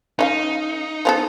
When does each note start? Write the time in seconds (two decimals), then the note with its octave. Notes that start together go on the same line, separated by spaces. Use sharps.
0.19 C#4 D#4 E5 F5
1.05 F3 B3 A4